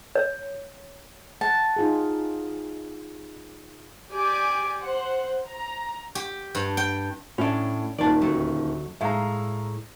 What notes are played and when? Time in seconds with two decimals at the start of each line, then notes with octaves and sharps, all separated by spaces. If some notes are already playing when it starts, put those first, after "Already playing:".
0.15 C#5
1.41 F#5 A5
1.76 D#4 F4 G#4
4.13 G4 D5 G#5 D6
4.84 C5 F#5
5.49 A#5
6.15 G4
6.55 G2
6.77 G5
7.38 A2 C#4 D4
7.98 D#1 D#3 D5 A5
8.21 D2 F#3 A3
9.01 A2 G#3 E5 F5 A#5